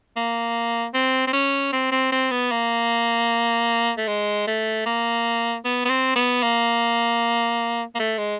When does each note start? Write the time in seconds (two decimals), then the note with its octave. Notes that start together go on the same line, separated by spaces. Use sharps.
0.16 A#3
0.94 C4
1.27 C4
1.33 C#4
1.73 C4
1.91 C4
2.12 C4
2.31 B3
2.51 A#3
3.97 A3
4.08 G#3
4.47 A3
4.86 A#3
5.65 B3
5.85 B3
5.90 C4
6.16 B3
6.43 A#3
7.95 A#3
7.99 A3
8.18 G#3